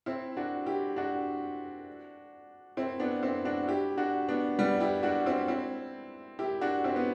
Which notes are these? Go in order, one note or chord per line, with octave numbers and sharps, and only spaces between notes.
C4 E4
D4 F#4
E4 G4
D4 F#4
C4 E4
B3 D4
C4 E4
D4 F#4
E4 G4
D4 F#4
B3 D4
G3 B3
E4 G4
D4 F#4
C4 E4
C4 E4
E4 G4
D4 F#4
C4 E4
B3